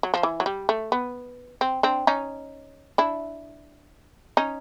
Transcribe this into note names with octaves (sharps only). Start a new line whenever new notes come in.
F#3
F3
E3
F#3
G3
A3
B3
C4
C4 D4
C#4 D#4
D4 E4
C#4 D#4